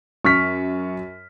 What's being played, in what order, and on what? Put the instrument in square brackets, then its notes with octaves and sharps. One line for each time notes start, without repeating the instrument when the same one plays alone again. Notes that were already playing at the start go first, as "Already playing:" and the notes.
[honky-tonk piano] F#2 [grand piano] C#6 F6 B6